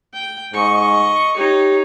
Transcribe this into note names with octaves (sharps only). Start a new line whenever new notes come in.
G5
G#2 D#5 C#6
D#4 G4 C#5